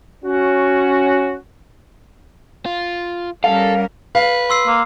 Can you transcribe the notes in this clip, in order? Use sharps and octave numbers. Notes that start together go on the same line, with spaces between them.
C#4 F#4
F4
G3 C#4 A4 A#4 F5
B4 F5
C6 E6 C7
A#3